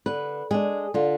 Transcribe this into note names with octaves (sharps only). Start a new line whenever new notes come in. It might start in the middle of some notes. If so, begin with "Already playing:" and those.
D3 B4
G#3 D4 G#4
D3 F4